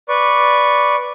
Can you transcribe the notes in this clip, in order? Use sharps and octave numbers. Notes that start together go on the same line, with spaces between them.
B4 D5 C#6